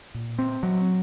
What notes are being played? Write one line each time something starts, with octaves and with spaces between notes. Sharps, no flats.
A#2
C4
F#3